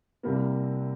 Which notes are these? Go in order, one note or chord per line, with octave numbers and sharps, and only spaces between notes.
C2 C3 G3 A#3